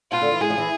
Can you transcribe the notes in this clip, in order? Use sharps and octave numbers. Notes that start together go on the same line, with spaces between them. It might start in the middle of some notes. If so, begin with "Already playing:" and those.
B2 F4
D3
E3
G#3 G#4
F3
E3